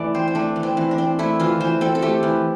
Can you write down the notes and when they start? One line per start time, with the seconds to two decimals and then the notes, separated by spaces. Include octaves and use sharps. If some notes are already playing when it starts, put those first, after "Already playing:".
Already playing: E3 A3 D5
0.15 C4 C5
0.28 C4
0.35 A3 D4
0.56 E3
0.63 C4
0.77 E3
0.91 D4
0.98 C4
1.19 A3 E4
1.40 E3 F4
1.60 E3 C5
1.81 C4 A4
1.95 A4
2.02 A3 G4
2.23 E3